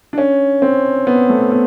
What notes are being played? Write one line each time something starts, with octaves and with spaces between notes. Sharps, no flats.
D4
C#4
C4
B3
A3
B3